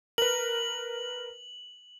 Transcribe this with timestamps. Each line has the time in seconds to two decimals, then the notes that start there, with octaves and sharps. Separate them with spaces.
0.18 A#4 B4 F#7